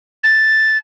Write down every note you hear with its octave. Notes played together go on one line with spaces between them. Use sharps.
A6